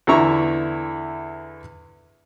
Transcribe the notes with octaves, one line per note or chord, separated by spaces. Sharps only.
E2 D3 E4 A#5 C#6